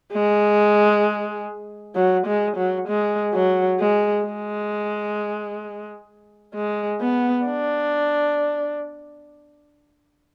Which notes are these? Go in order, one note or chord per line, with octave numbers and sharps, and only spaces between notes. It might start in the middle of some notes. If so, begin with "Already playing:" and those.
G#3
F#3
G#3
F#3
G#3
F#3
G#3
G#3
G#3
B3
D4